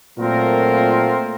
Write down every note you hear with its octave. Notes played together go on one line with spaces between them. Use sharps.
A#2 F#3 A3 C4 F4 A#4